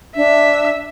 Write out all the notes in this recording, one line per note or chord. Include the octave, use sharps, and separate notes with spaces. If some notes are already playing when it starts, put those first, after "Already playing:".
D4 E5